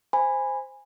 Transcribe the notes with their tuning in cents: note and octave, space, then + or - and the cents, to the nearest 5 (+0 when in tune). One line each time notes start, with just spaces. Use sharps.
C5 +0 G#5 -15 B5 +0